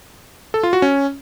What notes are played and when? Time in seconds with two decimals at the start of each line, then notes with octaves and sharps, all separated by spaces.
0.54 A4
0.63 F4
0.73 F#4
0.82 C#4